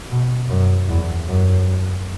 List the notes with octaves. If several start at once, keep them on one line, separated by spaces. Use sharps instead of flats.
B2
F#2
E2
F#2